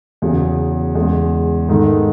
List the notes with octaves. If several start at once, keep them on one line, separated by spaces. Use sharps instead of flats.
E2 C#3 F#3
E2 C#3 G#3
G#2 D#3 A3 D#4